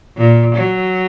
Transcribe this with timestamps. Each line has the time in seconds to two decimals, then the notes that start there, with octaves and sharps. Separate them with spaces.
0.17 A#2
0.55 F#3